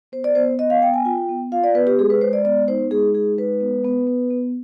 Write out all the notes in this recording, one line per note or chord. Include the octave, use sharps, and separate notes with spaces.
B3 C5
D5
B3 C5
B3 D#5
F5
B3 G5
G#5
F4 G5
B3
F4 F5
D5
B3 B4
G4
G#3 G#4
B4
G#3 C5
D5
B3 D5
D#4 C5
G#3 G#4
D#4 G#4
G#3 B4
B3
B3
B3
B3